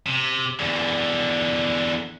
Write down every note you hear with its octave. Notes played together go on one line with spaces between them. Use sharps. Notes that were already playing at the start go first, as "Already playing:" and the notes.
C3
E2 D3